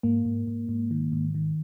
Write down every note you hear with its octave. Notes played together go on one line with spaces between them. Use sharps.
G#2 A#3
G#2
G#2
G#2
D#3
G#2
D#3